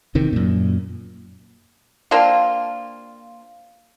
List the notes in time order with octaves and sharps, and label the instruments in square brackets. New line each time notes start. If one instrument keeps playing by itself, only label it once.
[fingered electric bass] E2 C3 D#3
F#2 A#2
[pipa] A#3 C4 D4 F4